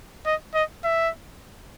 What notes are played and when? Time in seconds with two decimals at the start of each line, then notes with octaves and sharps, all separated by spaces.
0.26 D#5
0.54 D#5
0.84 E5